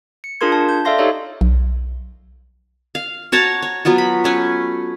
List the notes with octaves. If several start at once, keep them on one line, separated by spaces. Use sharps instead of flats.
C#7
D4 F4 G#4 A#4 C6 G#6
A5
G6
A4 D5 E5 F5 C6 A#6
D#4 G4 A4 C#5 D#5
B1
F5
F#4 C#5 A5 A#5
C#5
F#3 B3 F4 F#4
B5
A3 C#4 B4